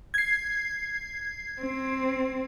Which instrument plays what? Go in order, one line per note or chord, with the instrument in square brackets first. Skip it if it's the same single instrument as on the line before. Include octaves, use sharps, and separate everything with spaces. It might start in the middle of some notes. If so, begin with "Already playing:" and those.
[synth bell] G#6 C7
[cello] C4